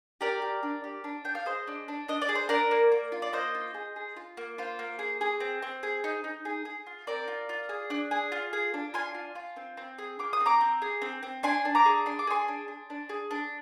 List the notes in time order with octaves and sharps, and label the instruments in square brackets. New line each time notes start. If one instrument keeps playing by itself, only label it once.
[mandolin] G4 A#4 D5
G4
D4
G4
D4
D4 G5
F5
G#4 C5 D#5
D4
D4
D4 D#5
D5
G#4
C5
D4 A#4 D5
A#3
A#3
F4
D5
A#3 C5 D#5
F4
G#4
G#4
F4
A#3
F4 C5
A#3
G#4
G#4
C4
C4
G#4
D#4
D#4
G#4
G#4
F4
C4 A#4 D5
F4
F4
G#4
D4
G#4
F4
G#4
D4
F4 G#5 C6
F4
F4
C4
C4
G#4
F4 D6
D#6
C4
A#5 D6
C4
G#4
C4
C4
D4 G#5 C6
D4
A#5 D6
G#4
D4 C6
D6
G#4 G#5 C6
D4
D4
D4
G#4
D4